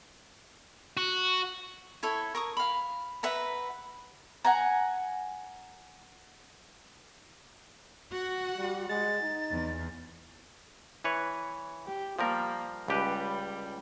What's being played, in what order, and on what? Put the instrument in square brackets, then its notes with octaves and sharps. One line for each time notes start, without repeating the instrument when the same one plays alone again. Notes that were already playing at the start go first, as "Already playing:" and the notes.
[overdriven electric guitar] F#4
[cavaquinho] E4 A4 C#5 E5
A#4 C#6 D#6
F5 B5
B4 E5 F#5 A#5
[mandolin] F#5 G#5 A#5
[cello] F#4 F#5
[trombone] G3
[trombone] G#3 [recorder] A6
[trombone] D#4
[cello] E2
[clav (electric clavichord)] E3 B4 C#5
[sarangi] G4
[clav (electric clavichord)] F3 G3 A#4 [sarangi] A#3
[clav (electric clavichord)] C#2 G4 B4 [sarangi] G3